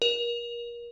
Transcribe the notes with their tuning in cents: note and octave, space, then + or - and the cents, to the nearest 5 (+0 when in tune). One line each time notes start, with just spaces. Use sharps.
A#4 +30